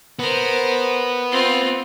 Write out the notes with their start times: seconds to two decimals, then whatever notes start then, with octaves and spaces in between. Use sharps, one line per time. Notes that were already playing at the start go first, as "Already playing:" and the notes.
0.19 B3 A#4 C5
1.31 C4 F4